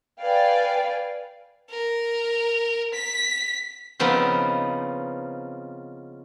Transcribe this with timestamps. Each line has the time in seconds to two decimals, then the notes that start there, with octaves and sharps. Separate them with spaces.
0.22 B4 D5 F5 G5 G#5
1.70 A#4
2.94 B6
4.00 C#3 F3 B3 C4 D#4